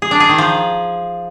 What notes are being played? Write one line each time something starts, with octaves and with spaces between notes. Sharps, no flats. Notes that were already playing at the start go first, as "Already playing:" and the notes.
G#4
D4
G#4
D#3
F3